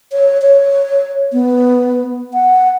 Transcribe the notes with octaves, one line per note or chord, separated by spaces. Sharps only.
C#5
C#5
B3
F#5